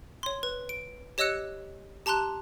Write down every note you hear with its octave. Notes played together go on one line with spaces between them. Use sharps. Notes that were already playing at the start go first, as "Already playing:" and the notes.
C#5 C6
B4
D7
G4 C#5 D#5 E6 F#6 C#7
G4 A5 A#5 C6 F#6